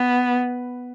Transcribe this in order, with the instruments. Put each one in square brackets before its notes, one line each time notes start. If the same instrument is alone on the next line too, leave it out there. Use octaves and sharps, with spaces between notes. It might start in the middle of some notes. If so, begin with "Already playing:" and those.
Already playing: [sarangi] B3